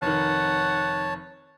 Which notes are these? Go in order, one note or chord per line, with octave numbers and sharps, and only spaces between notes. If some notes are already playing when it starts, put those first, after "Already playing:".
F1 D#3 C#5 F#5 A5